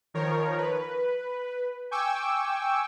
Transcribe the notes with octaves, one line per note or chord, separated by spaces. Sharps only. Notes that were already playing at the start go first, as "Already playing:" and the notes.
D#3 F3 A#4 C#5
B4
G5 G#5 C#6 D6 E6